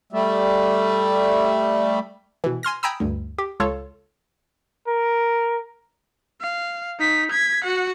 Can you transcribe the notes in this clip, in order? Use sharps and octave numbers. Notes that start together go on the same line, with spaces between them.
G3 A3
B2 E3
G#5 C6 F6 A#6
G5 G#5 A#5 B5 D#6 E6
D2 G2
G4
C#2 F4 A4 C#5
A#4
F5
D#4 B6
G#6 B6
F#4 F#5